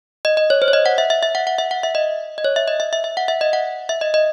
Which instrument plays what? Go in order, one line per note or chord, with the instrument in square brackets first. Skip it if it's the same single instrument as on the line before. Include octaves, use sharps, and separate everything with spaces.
[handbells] D#5
D#5
C#5
C5
C#5
D#5
F#5
E5
E5
E5
F#5
F#5
E5
F#5
E5
D#5
D#5
C#5
E5
D#5
E5
E5
E5
F#5
E5
D#5
F#5
E5
D#5
D#5